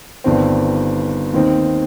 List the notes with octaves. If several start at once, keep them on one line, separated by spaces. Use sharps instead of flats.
G1 G2 D#3 C4
D#2 D#3 C4 D#4